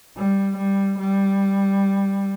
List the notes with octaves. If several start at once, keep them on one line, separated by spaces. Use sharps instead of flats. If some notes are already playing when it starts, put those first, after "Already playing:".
G3
G3
G3